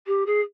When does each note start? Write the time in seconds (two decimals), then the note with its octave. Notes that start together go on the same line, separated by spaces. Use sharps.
0.07 G4
0.26 G#4